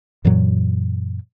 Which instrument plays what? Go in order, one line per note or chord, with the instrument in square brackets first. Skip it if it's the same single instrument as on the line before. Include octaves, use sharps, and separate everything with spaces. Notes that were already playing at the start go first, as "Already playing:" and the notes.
[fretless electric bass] F#2 A#2 E3 F#3